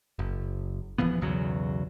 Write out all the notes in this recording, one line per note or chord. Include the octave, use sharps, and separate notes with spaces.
F#1
D#1 E3 F3 B3
B1 E2 C#3 F#3